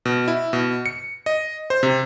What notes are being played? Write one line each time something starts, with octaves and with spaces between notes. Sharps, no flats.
B2
E4
B2
C#7
D#5
C5
C3